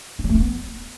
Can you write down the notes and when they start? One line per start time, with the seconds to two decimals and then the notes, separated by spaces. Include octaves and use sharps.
0.19 D4
0.24 G3
0.29 A3
0.35 D4
0.40 B3